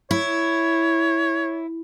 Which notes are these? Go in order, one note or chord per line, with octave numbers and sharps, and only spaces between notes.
E4 C#5